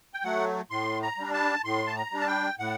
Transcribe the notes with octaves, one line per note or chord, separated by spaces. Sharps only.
G5
F#3 A3 F#5
A2 C6
A#5
G3 D4
A5
A2 C6
A5
A#5
G3 D4
A5
G5
A2 F#5